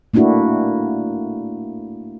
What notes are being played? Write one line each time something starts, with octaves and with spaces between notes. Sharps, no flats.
A3 A#3 D4 E4 F#4